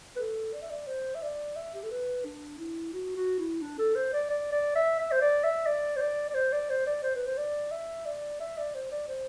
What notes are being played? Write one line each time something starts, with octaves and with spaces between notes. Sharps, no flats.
B4
A4
D5
E5
D5
C5
E5
D5
E5
G4
A4
B4
D4
E4
F#4
F#4
E4
D4
A4
C5
D5
D5
D5
E5
E5
C5
D5
E5
D5
C5
D5
D5
C5
D5
C5
D5
C5
B4
C5
D5
E5
D5
E5
D5
C5
D5
C5